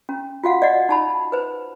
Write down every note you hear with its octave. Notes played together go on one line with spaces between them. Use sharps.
C#4
F4 F#4 F5 F#5
D5 D#5 F#5
D#4 A5 B5
B4 C5